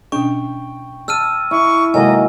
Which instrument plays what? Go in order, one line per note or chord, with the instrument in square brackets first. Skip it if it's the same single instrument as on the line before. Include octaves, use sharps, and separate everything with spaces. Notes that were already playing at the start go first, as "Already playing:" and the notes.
[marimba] B2 C#4 D4 [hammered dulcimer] G5 [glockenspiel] C#6
[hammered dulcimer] A5 [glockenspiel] E6 F6 D#7
[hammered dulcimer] E4 [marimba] E5 [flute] C#6
[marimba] C3 G#3 A4 [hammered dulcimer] D#3 F#3 A#3 [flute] D#5 [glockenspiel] G#5